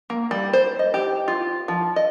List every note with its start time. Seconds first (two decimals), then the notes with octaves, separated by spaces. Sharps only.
0.10 A#3
0.31 G3
0.53 C5
0.79 D#5
0.94 G4
1.28 F4
1.68 F3
1.96 D#5